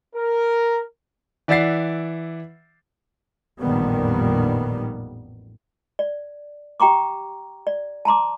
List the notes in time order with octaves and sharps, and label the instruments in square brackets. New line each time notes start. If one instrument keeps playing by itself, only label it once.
[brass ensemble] A#4
[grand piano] E3 D5 E5 F#5 A6 C7
[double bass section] A1 F2 A#2 D#3 G3 B3
[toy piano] D5
G4 G5 A#5 C#6 D6
D5
A5 A#5 C6 D6